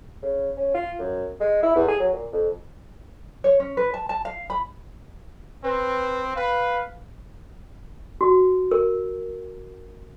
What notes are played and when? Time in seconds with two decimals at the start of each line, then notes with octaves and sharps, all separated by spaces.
0.22 C#3
0.57 C#4
0.74 F4
0.99 F#2
1.41 G#3
1.62 E4
1.76 E2
1.88 G#4
2.00 F#3
2.13 A#2
2.32 F2
3.44 C#5
3.60 C#4
3.77 B4
3.94 A5
4.09 A5
4.25 F5
4.50 B5
5.64 C4 B4
6.36 B4 F5
8.21 F#4
8.71 A#4